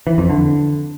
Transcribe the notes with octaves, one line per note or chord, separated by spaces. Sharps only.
E3
F2
D3